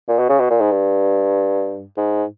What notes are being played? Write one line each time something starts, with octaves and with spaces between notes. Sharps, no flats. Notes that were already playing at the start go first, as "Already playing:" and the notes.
A#2
B2
C#3
B2
A#2
G#2
G2
G#2